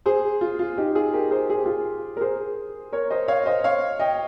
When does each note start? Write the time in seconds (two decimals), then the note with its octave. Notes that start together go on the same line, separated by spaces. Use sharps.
0.06 G#4 C5
0.41 F4
0.59 F4
0.78 D#4 G4
0.95 F4 G#4
1.13 G4 A#4
1.31 G#4 C5
1.50 G#4
1.57 G4
1.66 F4 G#4
2.17 A#4
2.21 G#4 C5
2.92 A#4 C#5
3.10 C5 D#5
3.28 C#5 F5
3.46 C5 D#5
3.64 C#5 F5
3.99 D#5 G5